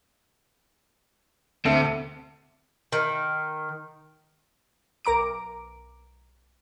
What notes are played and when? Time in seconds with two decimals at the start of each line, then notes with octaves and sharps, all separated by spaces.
1.65 D2 C3 A4 E5
2.92 D#3
5.05 B1 A#4 A#5 D6 D7